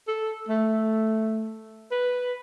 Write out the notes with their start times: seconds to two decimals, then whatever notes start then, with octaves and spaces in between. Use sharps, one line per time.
0.07 A4
0.48 A3
1.91 B4